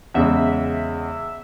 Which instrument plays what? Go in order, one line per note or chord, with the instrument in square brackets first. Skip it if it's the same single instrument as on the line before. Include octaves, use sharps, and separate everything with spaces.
[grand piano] E2 C#3 G#3 [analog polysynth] E5